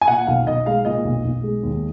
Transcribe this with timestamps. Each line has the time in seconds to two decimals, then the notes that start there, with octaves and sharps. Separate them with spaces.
0.01 G#5
0.08 A#2 F#5
0.27 B1 F5
0.47 B1 D#5
0.66 G#3 F5
0.85 A#2 D#5
1.04 B1
1.25 B1
1.43 G#3
1.63 D#2